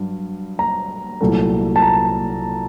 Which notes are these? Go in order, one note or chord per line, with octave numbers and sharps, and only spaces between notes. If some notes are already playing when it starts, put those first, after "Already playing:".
Already playing: G2 F#3
A#5
C2 A#2 F#3 A3
A5
A#5